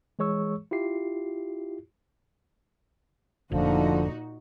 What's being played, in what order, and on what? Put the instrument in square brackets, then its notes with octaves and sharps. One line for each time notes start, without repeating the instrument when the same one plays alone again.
[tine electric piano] E3 G#3 G#4 C#5 C#6 E6
E4 F4 G4 C7
[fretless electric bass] F1 [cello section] A#2 D#4 F#4 [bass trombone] D3 [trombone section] F3